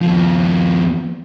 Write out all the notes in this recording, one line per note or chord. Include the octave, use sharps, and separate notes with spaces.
D#2 F3